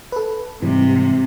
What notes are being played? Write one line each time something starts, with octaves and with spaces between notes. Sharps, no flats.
A4 B4
G#2 C3 E3 G3